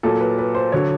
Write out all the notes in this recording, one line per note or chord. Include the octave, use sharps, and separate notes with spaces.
A#2 F#3 A4
B4
B4
C5
D3 F#3 C#5